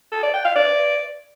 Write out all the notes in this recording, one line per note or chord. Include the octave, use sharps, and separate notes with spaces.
A4
D5
G5
F5
D5